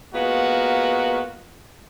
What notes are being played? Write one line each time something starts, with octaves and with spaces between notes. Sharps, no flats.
G#3 A#3 B3 F4 F#4 A#4